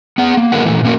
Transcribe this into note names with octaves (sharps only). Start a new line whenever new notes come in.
B3 G#4 F#5
A#3
D3 F#3 G#3 B3 A#4 F#5
A#2 E3 A3
A3 A#3 C#4 F#4 A#4